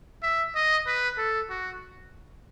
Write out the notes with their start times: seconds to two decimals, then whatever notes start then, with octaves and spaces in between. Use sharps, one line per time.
0.23 E5
0.55 D#5
0.87 B4
1.18 A4
1.50 F#4